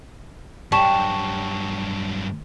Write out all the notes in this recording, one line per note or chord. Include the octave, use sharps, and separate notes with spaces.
G2 F#3 G3 A5 C#6 E7